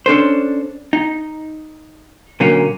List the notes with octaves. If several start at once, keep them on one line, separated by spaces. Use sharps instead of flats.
C#4 D4 A4 C5
D#4
A#2 D3 F#3 A#3 C#4